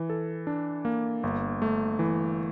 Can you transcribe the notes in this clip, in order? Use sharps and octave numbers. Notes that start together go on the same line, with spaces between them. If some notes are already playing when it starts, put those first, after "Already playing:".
Already playing: E3
A4
D4
A#3
G1
A3
E3